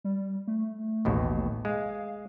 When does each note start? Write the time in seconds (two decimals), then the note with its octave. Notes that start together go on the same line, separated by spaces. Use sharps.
0.04 G3
0.47 A3
1.05 A1 D#2 B2
1.65 G#3 F5